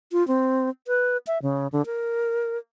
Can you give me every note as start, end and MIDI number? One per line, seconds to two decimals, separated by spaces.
0.12 0.26 65
0.28 0.69 60
0.87 1.17 71
1.27 1.38 76
1.42 1.68 49
1.72 1.85 50
1.86 2.58 70